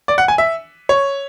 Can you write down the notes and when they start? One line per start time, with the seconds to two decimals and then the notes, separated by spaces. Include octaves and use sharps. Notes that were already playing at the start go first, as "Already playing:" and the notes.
0.08 D5
0.18 F#5
0.28 G#5
0.38 E5
0.89 C#5